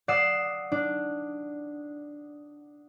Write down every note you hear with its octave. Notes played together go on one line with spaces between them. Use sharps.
D5 F#5 D#6 E6 C7
D4